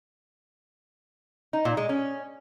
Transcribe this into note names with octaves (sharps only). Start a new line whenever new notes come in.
D#4
A#2
G#3
C#4